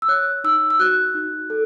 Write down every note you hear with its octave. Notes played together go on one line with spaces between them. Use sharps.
E6
C#5 F#6
D#4 E6
E6
F#4 F#6
D#4
A4